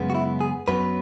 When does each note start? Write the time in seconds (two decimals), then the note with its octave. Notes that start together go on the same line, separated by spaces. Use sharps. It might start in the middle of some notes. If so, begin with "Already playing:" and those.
Already playing: F#2 C#3 G#3 B3
0.10 F#4
0.15 E4
0.41 G#4
0.68 F#2 F#3 B3 B4